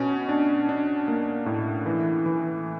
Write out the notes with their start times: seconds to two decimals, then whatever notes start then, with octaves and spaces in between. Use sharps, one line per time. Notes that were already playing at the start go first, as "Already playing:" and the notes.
Already playing: B2 C#4
0.29 D4
0.69 D4
1.08 A#3
1.46 A2
1.86 E3
2.26 E3